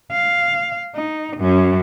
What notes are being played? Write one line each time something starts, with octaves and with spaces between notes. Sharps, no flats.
F5
D#4
F#2 C#4